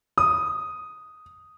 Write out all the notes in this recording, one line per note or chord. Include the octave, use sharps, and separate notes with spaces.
D#6